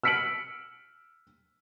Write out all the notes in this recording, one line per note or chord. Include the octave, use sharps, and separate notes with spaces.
E6 F6 B6 C#7 D7 F#7